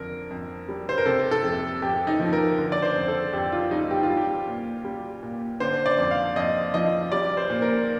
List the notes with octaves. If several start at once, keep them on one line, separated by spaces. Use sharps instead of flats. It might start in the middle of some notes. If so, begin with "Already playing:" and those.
Already playing: F2 D3 A#4
F2
G3
C5
A#4
C3 A4
A4
F2
F2 G4
D#4
F3
A#4
D3
D5
C5
F2
A4
F2 G4
F4
G3 D#4
G4
F4
G3
G4
A#2
G3
A#2
D3 C5
D5
F2
F5
F2 D#5
F3 D#5
G3 D5
C5
A#2
A#4